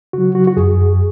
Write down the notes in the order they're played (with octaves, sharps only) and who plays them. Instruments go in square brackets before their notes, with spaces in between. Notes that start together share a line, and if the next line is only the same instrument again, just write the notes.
[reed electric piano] C#3 F#3 F#4
F#4
F#4
F#2 G#4